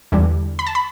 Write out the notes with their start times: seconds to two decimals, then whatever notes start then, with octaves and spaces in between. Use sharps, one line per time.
0.12 E2 D3 G3
0.59 B5
0.67 A5
0.75 B5